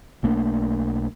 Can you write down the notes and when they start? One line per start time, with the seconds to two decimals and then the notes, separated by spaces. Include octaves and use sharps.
0.23 B1 A3 A#3 D4